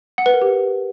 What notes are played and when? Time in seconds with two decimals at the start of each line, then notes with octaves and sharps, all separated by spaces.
0.18 F#5
0.26 B4
0.34 A#4
0.41 G4